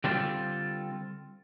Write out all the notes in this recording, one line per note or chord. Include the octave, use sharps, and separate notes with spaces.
D3 G3 C4 F4 A4